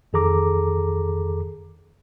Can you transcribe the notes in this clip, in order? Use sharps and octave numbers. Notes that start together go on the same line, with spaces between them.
F2 D#3 G#4 A4 A#5 D6